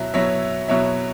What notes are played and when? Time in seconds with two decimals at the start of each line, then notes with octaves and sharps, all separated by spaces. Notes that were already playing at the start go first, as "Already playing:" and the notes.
Already playing: B2 F#3 E4 E5
0.14 B2 F#3 E4 C#5 E5
0.68 B2 F#3 E4 C#5 E5